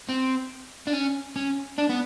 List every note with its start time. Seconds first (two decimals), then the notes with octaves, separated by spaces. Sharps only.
0.09 C4
0.87 D4
0.93 C#4
1.36 C#4
1.78 D4
1.89 B3